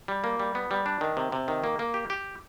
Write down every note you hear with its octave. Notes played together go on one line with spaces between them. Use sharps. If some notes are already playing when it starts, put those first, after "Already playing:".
G3
A#3
G3
B3
G3
D4
D#3
C3
C3
D#3
A#3
A#3
G4
G4